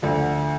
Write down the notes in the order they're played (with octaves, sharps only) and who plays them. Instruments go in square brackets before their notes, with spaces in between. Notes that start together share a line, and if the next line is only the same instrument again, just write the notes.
[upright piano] D2 D3 F3